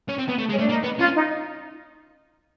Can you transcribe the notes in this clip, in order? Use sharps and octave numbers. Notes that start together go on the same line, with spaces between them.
C#4
C4
B3
A3
G#3 C#4
A3 D4
A#3 D#4
B3
C#4 F4
D#4